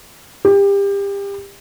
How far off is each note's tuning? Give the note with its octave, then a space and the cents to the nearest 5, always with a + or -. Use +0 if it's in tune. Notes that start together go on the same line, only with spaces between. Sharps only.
G4 +30